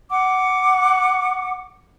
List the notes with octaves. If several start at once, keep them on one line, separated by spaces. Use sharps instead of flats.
F#5 D6